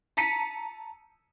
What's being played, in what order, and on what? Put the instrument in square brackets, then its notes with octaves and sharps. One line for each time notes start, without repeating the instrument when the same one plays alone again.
[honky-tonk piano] A5 A#5 B6 C#7 D#7